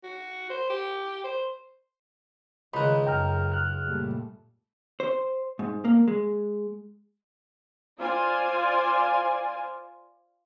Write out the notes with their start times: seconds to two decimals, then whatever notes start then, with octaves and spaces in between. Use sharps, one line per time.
0.03 F#4
0.50 C5
0.70 G4
1.24 C5
2.74 C#2 D#3 G#3 D#4 B5 F#6
3.07 F#2 G5 A#5 F6
3.52 F6 F#6
3.87 A#2 G3 A3
5.00 C5
5.59 G#2
5.85 A#3
6.08 G#3
7.99 F4 C5 D5 G#5